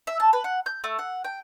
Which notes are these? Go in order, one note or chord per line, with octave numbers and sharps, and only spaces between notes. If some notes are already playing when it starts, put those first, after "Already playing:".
E5
A5
B4
F#5
G6
A3
F#5
G5